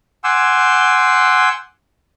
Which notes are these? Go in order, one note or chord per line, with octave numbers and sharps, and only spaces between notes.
F#5 G#5 C6 D6 E6 G6